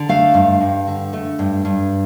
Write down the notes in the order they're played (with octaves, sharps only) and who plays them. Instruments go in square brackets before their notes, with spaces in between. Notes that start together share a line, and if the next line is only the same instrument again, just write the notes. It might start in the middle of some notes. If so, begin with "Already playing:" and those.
Already playing: [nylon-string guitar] D3
A3 F5
G2
G2
D3
A3
G2
G2